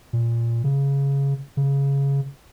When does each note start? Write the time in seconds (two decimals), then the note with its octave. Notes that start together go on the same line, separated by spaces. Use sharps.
0.13 A#2
0.64 C#3
1.57 C#3